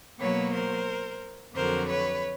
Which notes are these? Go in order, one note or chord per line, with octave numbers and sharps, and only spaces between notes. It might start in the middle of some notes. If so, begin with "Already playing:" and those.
B2 F#3 A#3 B4 C#5
A#4 C5
F2 D3 F#3 A#4 C5
B4 C#5